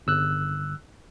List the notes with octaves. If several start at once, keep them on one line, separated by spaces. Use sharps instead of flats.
G1 E6 F#6